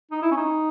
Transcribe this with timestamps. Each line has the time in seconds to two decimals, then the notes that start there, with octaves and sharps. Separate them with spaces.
0.11 D#4
0.22 E4
0.31 C#4
0.37 D#4